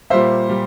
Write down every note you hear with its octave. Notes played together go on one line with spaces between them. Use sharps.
A#2 G3 A#3 C5 E5
A#2 G3